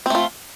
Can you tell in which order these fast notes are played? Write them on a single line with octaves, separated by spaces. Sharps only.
C4 A3 F4